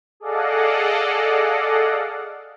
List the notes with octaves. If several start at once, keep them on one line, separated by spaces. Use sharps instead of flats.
G#4 A4 D5 D#5 F5 F#5